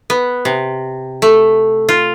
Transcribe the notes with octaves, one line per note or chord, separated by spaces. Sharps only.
B3
C3
A3
F4